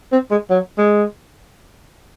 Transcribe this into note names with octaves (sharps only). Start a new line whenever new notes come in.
C4
G#3
F#3
G#3